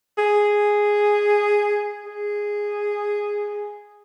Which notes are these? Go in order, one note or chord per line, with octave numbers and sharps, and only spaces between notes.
G#4
G#4